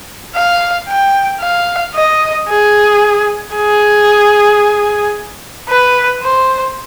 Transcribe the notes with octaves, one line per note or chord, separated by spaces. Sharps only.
F5
G5
F5
D#5
G#4
G#4
B4
C5